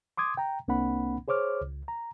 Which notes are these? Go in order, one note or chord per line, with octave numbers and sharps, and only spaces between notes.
C6 D6 D#6 G#6
G5 A#5
C2 A#3 C4 D4 F#5 B5
G#4 C5 C#5 D6 F6
C#2
A#5